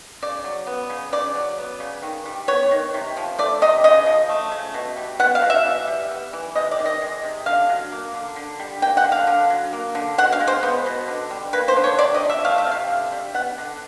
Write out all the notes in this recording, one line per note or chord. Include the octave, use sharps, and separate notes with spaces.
C#3 D5
F#3
B3
C#3
C#3 D5
F#3
B3
C#3
D#3
G3
B3 C#5
D#3
C3
F3
A3 D5
C3 D#5
C#3 D#5
F3
A3
C#3
B2
G3
B3 F#5
F5
B2
E5
E3
G3
B3
E3
C3 D#5
D5
D#3
D#5
G#3
C3
D3 F5
F#3
A#3
D3
D3
G3
A#3 G5
F#5
D3
F5
D3
F#3
A#3
D3
B2 F#5
F5
G#3
C5
B3
B2
D3
G3
A#3 B4
C5
D3
C#5
C3 D5
D#5
F3
E5
A3 F5
E5
C3 F5
D3
G3
B3 F#5
D3